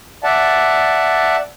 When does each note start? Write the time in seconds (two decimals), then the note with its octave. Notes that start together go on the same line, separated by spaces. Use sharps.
0.24 D5 E5 F#5 A5